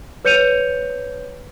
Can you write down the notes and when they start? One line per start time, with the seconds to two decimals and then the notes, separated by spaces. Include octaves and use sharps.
0.25 B4 C#5 G6 C#7 D#7 F7